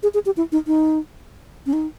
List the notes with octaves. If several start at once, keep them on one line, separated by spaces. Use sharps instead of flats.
G#4
G#4
G4
E4
D#4
D#4
C#4
D#4